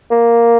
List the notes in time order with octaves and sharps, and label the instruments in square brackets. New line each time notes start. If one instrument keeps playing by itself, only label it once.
[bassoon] A#3